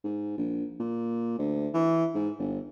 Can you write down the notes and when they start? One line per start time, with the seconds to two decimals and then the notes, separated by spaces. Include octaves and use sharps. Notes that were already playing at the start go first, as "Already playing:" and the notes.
0.04 G#2
0.38 A#1
0.80 A#2
1.39 D2
1.74 E3
2.15 G#2
2.39 G1